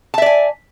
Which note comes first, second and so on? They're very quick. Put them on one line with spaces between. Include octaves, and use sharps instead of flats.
A5 E5 D5 G#5